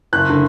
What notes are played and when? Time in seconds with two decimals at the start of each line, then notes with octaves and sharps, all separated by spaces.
0.13 F#1 F#6
0.30 D3